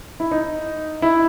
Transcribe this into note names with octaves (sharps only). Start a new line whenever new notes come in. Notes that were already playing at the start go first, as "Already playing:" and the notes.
E4
D#4
E4